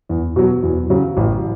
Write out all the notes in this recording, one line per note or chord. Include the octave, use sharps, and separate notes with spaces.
E2
B2 F#3
E2
C#3 F#3
A1